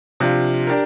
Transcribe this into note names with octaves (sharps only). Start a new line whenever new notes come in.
C3 F3 D4 F4
D4 G4 A#4